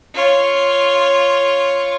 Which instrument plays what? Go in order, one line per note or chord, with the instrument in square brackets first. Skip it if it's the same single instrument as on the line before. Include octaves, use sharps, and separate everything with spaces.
[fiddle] F4 C#5